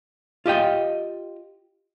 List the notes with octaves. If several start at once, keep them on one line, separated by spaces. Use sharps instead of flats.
F4 G4 D#5 G5